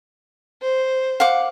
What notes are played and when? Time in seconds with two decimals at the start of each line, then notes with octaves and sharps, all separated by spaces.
0.62 C5
1.20 F5 F#5 D6